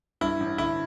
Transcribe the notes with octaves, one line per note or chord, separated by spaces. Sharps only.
G2 E4
A1
D3 E4